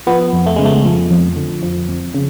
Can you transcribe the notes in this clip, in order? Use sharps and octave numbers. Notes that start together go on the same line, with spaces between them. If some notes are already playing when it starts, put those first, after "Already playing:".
F3 B3
F2
A3
C#3 G#3
A3
F3
F2
D3
F3
F2
C#3